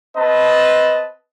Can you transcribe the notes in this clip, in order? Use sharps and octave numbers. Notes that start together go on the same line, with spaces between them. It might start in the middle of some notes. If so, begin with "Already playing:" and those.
C4 B4 D#5 A5